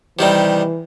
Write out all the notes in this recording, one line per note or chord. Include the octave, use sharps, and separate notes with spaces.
C3 D#3 E3 G3